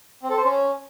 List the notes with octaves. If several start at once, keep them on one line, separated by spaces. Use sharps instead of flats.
C4
A4
C5
C#4